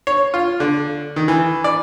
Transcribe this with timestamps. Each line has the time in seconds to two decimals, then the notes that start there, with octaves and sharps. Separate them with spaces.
0.07 C#5
0.34 F4
0.60 D3
1.16 D#3
1.28 E3
1.64 D5